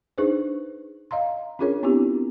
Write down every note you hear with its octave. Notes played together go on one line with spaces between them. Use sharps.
D4 D#4 G#4 B4 C5
D#5 F5 A#5 C6
C#4 D4 F4 G#4 A#4 C#5
B3 C4 D4 E4 F4 G4